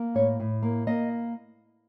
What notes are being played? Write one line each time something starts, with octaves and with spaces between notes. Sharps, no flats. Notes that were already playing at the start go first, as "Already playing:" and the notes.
Already playing: A#3
A2 C#5
A2
A#3
A#3 D#5